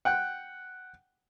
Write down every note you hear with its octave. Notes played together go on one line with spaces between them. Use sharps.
F#5 G5 F#6